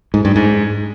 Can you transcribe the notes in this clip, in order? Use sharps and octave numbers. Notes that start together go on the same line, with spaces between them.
G#2
G2
G#2